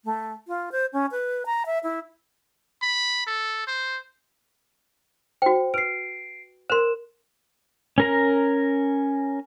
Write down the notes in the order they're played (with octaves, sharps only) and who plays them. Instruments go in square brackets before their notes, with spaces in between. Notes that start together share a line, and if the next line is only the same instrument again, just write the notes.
[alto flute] A3
F4
C5
C#4
B4
A#5
E5
E4
[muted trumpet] B5
A4
C5
[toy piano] F#4 G5 [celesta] C5
[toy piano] B4 [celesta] C7 D7
[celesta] A#4 E7 [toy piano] C5 C6
[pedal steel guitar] C#4 A#4 A#5